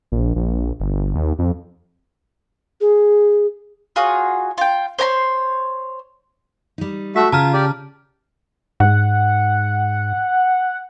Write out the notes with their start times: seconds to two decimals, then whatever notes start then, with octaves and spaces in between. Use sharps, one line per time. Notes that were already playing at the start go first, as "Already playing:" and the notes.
0.12 A#1
0.36 A#1
0.80 G1
1.15 D#2
1.39 F2
2.81 G#4
3.96 F4 F#4 G#4 C#5
4.58 F4 G5
4.99 C5 C#5 A#5 C6
6.78 G3 D#4
7.16 A3 F#4 E5 B6
7.32 C#3 F4 A5 A#5 F6
7.53 G4 D5
8.80 G#2 F#5